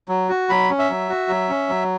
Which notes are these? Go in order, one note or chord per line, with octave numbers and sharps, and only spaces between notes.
F#3
F#4
F#3 B5
C#4
E5
F#3
F#4
F#3
C#4
F#3